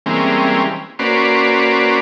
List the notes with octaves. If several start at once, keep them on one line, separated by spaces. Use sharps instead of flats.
E3 G3 G#3 A#3 C4 C#4
A#3 C#4 F#4 B4 C5 D5